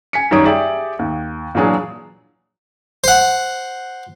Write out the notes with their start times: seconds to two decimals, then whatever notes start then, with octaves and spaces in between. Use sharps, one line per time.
0.13 G#5 B6 C#7
0.31 F#2 D#3 G3 C#5 D#6 D7
0.45 G4 G#4 D5 E5
0.99 D#2
1.55 A#2 E3 F#3 D4 G#4
3.04 C5 F#5